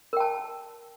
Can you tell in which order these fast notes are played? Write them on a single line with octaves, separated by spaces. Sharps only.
A#4 G5 A5